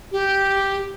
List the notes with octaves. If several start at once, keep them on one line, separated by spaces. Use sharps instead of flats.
G4